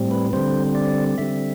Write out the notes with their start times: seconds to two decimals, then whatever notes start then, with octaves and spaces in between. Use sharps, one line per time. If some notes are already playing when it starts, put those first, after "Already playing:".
Already playing: A2 G3 C4
0.11 B4
0.33 D3 G3 C4 C5
0.75 D5
1.18 D3 G3 C4 E5